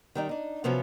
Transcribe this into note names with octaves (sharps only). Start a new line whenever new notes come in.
D#3 G3 D#4
D4 D#4
C3 F3 F#3 B3 C#4 F4